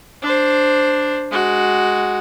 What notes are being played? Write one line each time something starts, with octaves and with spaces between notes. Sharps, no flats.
D4 C5
G#3 F#4